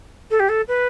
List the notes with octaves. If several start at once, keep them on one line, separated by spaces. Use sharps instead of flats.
A4
G4
A4
B4